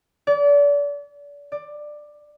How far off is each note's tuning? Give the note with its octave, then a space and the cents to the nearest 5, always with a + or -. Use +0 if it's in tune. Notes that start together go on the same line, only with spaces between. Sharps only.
D5 -35
D5 +15